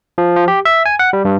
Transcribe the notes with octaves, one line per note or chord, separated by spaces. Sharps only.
F3
F3
G4
E5
G#5
F#5
G3
G2